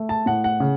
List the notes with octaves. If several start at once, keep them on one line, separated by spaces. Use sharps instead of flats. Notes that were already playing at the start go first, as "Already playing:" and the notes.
Already playing: A3
A5
A2 F#5
F#5
C#3